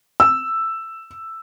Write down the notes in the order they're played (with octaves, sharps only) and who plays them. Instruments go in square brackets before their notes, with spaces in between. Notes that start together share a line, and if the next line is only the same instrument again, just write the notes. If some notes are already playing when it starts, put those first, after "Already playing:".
[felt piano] E6